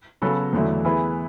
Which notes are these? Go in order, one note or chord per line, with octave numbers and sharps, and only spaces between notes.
C#3 F#3 B3 F#4 A4
E2 D3 F#3 A3 E4
E3 B3 E4 G#4 B4